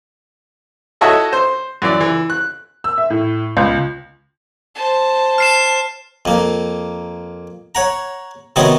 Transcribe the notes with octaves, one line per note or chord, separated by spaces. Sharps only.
E4 F#4 A4 C#5 D#5 E5
C5
F#2 E3 D5
E3
F#6
E6
E5
A2
C#2
C5 A5
F6 C7 E7
F2 A#3
C#5 F#5 A#5
C3 D#3 B3 F#4 C#5